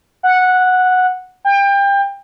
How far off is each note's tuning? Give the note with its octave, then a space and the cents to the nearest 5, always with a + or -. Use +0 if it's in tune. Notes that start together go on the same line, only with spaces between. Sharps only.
F#5 -10
G5 +25